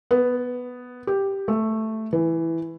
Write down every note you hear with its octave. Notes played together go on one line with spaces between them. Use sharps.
B3
G4
A3
E3